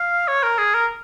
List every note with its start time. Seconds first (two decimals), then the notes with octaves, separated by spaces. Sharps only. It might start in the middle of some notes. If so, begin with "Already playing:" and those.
Already playing: F5
0.28 C#5
0.43 A#4
0.58 G#4
0.74 A#4